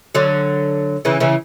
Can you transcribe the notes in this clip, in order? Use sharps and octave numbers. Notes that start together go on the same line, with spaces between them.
D3 F#3
C#3 E3
C#3 E3